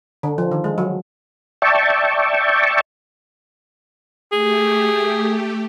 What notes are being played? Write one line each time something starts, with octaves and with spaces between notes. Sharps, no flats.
D3
F3
D#3
G#3
F#3
D5 E5 G5 A5 C#6
A3 G4 G#4